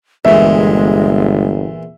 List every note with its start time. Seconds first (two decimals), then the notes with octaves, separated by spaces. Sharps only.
0.25 G1 E2 A#2 G#3 E5